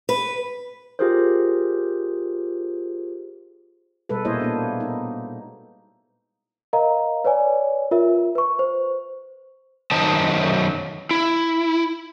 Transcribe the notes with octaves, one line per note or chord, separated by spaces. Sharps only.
B4
F4 G4 G#4 A#4 C5
B2 G3 G#3 A4 B4
A#2 A#3 E4 C5 C#5 D#5
A#3 B3 D4
D#4
A#4 D#5 F5 A#5
B4 C#5 D5 G#5
F4 A#4 E5
B4 C#6
C5
F#2 D#3 F#3 D#4 C5 A5
E4